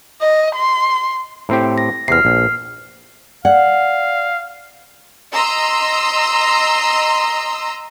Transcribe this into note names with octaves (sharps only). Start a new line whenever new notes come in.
D#5
C6
A2 C4 G4
A#6
E2 C3 F6 C7
A#1
D5 F5 F#5
D#5 A#5 C6 E6